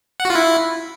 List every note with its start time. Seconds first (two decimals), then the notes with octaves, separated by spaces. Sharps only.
0.20 F#5
0.25 F#4
0.30 F4
0.35 E4